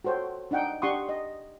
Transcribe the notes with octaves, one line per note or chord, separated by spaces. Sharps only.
F#4 A4 C5 C#5 G5
D4 D#4 F#5 G5
D4 G4 F#5 C6 C#6 D#6
D#5